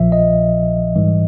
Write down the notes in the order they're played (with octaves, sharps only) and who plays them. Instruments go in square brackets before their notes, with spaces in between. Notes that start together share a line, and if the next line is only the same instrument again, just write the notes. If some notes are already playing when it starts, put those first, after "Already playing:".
Already playing: [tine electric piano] A#1 A#2 F3 E5
D#5
G#2 E3 G3